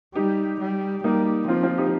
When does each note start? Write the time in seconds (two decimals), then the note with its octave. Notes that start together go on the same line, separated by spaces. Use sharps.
0.15 G3 D#4 G4
0.60 G3
1.04 G3 A#3 D#4
1.48 F3 C4 F4
1.63 C4 F4
1.78 D#4 G4